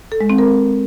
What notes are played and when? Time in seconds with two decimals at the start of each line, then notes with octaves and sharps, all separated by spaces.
0.12 A4
0.21 G#3
0.30 C4
0.38 A#4